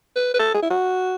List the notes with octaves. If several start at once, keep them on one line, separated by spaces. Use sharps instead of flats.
B4
B4
A4
G#4
E4
F#4